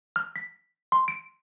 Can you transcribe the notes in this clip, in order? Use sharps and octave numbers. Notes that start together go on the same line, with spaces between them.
F6
B6
C6
D7